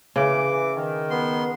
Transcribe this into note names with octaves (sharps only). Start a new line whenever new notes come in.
C#3 E3 D6
D#3
B3 C6